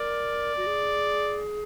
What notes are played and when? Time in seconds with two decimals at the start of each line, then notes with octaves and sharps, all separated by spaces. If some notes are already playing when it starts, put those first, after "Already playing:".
Already playing: A#4 D5
0.57 F#4
0.66 G#4